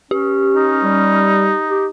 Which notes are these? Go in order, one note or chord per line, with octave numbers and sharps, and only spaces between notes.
C#4 G4
D#4
G3
G4